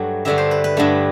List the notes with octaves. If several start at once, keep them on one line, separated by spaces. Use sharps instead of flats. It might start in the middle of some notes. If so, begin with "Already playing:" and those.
Already playing: G2 F#3 A3 F#5
G2 D3 A3 E5
C5
B4
B4
G2 D3 A3